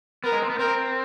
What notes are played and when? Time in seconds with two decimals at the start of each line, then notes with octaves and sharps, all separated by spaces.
0.24 B3 A#4
0.32 G#3
0.42 C4
0.50 B3
0.59 C4 A#4